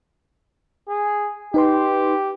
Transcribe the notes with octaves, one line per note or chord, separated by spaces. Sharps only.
G#4
D#4 G4 B4 C6